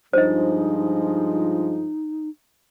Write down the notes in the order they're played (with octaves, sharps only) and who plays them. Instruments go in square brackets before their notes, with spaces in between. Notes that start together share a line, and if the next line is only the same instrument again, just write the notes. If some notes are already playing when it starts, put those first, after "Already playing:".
[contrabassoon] G2 [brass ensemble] F3 G#3 [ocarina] D#4 [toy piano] C5 D#5